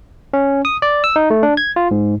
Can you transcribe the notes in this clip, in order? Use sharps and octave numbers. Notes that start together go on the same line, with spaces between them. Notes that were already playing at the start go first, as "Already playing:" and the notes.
C#4
D#6
D5
E6
D#4
A3
D4
G#6
F4
G#2